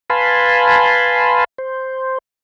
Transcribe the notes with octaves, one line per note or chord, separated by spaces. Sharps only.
B4 F5 G#5 A5 B5 C6
C5